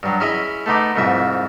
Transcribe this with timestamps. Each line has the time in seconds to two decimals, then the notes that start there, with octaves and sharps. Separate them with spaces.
0.03 G2 F#3
0.20 C#4 E4 G#4 D#5
0.66 A3 B3 D#4 D6
0.96 C2 F2 G#2 E5